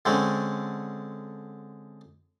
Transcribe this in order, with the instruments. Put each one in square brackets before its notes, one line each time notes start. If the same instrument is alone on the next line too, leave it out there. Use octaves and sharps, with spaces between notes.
[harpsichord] D3 G#3 C4 C#4